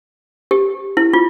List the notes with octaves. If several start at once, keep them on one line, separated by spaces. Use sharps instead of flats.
G4
E4
F4